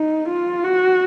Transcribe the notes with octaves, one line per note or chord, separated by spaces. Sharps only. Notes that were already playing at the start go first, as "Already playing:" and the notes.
Already playing: D#4
F4
F#4